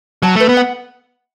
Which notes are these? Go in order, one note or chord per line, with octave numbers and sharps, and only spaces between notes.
F#3 A5
A3 B4
B3
F#5